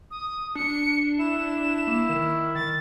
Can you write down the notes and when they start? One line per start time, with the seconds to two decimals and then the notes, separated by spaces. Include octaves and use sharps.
0.11 D#6
0.55 D4 C#7
1.19 E4 E7
1.87 A#3
2.09 D#3
2.55 D#3 A6